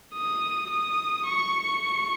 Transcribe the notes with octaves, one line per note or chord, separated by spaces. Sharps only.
D#6
D#6
C#6